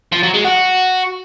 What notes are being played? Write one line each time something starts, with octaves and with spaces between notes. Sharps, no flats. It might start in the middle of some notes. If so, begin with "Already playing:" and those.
F3
F#3
G#3
F#4